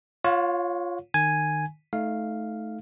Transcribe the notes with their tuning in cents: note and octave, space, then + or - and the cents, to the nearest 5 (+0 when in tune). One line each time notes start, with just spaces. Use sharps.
F4 +0 C#5 +0 F5 +45
D#3 -30 G#5 +0
A3 -15 D#4 +20 F5 +0